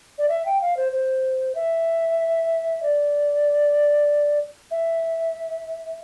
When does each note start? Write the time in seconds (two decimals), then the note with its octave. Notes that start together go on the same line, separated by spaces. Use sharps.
0.18 D5
0.29 E5
0.46 G5
0.61 F5
0.77 C5
0.92 C5
1.55 E5
2.83 D5
4.71 E5